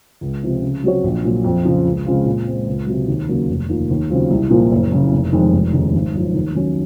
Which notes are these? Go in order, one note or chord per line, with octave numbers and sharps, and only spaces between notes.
C#2
C3 F3 C4
C#3
F#3 C4 F#4 C#5
A#1
A#2 F#3
F2
C#3 F3
C#2
C#3 G#3 C4 F4
A#2
G#3 C4
C#2
C3 F#3
D#2
C#3 F#3 A#3
F1
D#2 D#3 A#3 F4
D#2
C#3 F#3 C4 F4
C2
A#2 F3 A#3
F#1
F#2 C#3
F1
F2 D#3 G#3
F1
D#2 C#3 G#3 D#4
G#1
F#2 F3
D#2
D#3 F#3 C#4